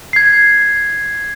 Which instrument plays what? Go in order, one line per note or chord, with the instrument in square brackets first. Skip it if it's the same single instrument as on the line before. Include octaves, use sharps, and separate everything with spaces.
[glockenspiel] G#6 C7